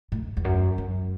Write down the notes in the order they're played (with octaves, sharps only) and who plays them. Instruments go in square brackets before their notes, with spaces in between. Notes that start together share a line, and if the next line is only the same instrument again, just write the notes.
[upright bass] A2
E2
F#2
F#2